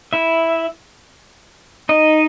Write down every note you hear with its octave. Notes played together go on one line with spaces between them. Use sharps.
E4 E5
D#4 D#5